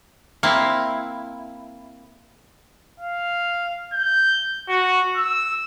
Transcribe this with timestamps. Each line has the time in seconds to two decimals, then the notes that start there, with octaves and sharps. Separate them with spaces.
0.43 A#3 C4 E4
3.00 F5
3.93 G6
4.69 F#4
5.17 E6